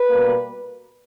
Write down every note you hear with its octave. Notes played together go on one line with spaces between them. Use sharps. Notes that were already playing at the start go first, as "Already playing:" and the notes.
Already playing: B4
B2 G3 A#3